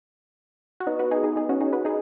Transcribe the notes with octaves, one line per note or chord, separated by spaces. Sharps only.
F#4
B3 D#4
F#4 B4
D#4 G#4
D#4 G#4
D#4 G#4
C#4 F#4
D#4 G#4
F#4 B4
D#4 G#4